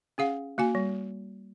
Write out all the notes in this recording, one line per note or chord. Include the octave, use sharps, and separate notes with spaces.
C#4 G#4 F5 F#5
A#3 F#4 G#5
G3